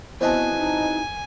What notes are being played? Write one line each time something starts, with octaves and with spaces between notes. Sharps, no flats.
E2 B3 C4 F#4 C5 D#5 G#5 A5
D#4